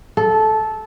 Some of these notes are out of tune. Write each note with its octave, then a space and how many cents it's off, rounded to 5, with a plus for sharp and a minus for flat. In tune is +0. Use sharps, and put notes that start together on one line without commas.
A4 -15